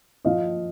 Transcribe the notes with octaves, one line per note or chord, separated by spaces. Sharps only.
F3 D#5 F5